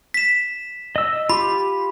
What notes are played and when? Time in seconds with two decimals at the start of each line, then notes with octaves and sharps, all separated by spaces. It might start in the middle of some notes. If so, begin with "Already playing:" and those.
0.14 B6 E7
0.96 D#5 E6
1.29 F4 G4 B5